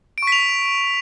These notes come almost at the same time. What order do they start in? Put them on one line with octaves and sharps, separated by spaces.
D7 C#6 B6 F7